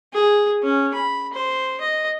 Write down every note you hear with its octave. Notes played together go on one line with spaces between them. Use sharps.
G#4
C#4
B5
C5
D#5